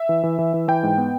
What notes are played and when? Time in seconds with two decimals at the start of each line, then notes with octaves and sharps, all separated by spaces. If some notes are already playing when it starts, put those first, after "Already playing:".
Already playing: E5
0.09 E3
0.23 E3
0.39 E3
0.54 E3
0.68 E3 G5
0.83 G#2
0.98 B3